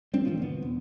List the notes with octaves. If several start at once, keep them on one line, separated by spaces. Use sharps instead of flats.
G3 C4 D4
A2 D#3 F3
F#1 B3
E1